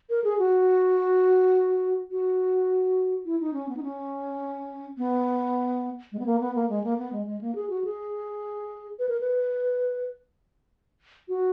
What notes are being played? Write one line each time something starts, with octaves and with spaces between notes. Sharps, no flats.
A#4
G#4
F#4
F#4
E4
D#4
C#4
B3
D#4
C#4
B3
G#3
B3
A#3
B3
A#3
G#3
A#3
B3
G#3
G#3
A#3
G#4
F#4
G#4
B4
A#4
B4
F#4